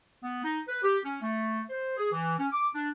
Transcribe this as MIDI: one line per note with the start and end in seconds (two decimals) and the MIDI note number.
0.23 0.41 59
0.43 0.59 63
0.68 0.80 71
0.83 0.98 67
1.04 1.20 61
1.22 1.62 57
1.70 1.95 72
1.97 2.12 68
2.12 2.36 52
2.38 2.48 61
2.52 2.67 86
2.73 2.88 62